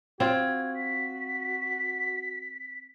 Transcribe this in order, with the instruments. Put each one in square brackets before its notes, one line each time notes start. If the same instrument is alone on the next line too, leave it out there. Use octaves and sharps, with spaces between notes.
[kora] C4 F4 [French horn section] F#4 [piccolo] G#6
[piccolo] B6